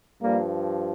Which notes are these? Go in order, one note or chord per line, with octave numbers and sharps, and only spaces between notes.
G2 F3 G3 A#3